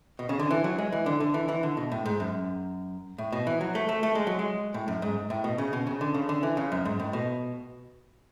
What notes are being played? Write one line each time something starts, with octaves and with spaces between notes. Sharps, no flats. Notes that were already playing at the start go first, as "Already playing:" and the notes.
B2
C#3
D3
E3
F#3
G#3
E3
D3
D3
E3
E3
D3
B2
A2
G#2
F#2
A2
B2
E3
F#3
A3
A3
A3
G#3
F#3
G#3
A2
F#2
G#2
A2
B2
C#3
B2
C#3
D3
C#3
D3
E3
C#3
F#2
G#2
A2
B2